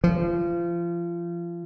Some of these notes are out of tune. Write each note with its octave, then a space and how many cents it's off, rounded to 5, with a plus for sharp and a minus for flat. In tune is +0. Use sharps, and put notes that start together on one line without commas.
F3 -30